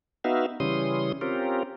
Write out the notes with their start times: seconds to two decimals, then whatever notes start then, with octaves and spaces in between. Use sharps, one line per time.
0.24 B3 D#4 F#4 E5 F5
0.60 C#3 E3 G3 C#4 C6 D#6
1.21 C4 C#4 F4 G4 A#4